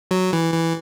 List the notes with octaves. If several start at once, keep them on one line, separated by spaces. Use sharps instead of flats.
F#3
E3
E3